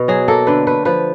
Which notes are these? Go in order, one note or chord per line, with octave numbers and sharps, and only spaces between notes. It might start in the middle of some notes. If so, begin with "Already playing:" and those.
Already playing: B2
F#3 G#4
A#3 A4
D3 B4
A3 B4
F3 B4